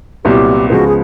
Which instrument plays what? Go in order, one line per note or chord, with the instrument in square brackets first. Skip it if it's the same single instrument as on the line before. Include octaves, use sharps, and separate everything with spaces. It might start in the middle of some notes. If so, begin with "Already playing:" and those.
[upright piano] C2 A#2 F#3 B3 E4 [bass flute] G4
[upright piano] C#2 C#3 F3 G#3 B3 [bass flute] F#4
[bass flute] G#4